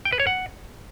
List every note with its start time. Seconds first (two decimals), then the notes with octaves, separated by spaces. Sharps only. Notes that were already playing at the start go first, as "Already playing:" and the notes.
0.05 G5
0.13 B4
0.20 C#5
0.27 F#5